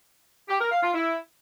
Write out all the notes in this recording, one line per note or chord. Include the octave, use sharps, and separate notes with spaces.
G4
A#4
F5
F4
E4